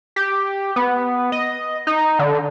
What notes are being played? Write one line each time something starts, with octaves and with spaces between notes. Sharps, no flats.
G4
B3
D#5
D#4
D3